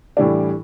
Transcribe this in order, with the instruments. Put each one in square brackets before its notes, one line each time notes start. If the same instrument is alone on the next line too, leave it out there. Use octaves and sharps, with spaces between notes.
[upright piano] A2 E3 G3 D4